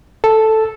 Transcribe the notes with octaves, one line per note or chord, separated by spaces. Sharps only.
A4